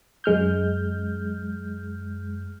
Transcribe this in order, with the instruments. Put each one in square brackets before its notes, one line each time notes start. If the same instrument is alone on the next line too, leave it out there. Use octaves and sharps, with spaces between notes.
[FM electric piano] F#2 G#3 F6 G6